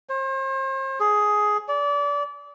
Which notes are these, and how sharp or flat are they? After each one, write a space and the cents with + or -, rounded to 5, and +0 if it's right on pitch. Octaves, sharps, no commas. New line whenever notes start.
C5 +40
G#4 +10
D5 -30